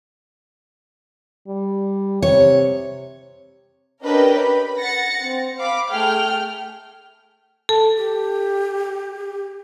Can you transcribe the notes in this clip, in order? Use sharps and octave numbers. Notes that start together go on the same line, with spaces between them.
G3
C3 C#5
C#4 D4 G4 A#4 B4 D#5
B5
F#5 A6 A#6 C#7
C4
F5 B5 D6
A3 G#4 G5 F6
A4 A5
G4